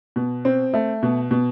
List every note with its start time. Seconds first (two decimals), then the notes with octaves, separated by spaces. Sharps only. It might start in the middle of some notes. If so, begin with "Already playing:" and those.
0.16 B2
0.45 C4
0.74 A3
1.03 B2
1.31 B2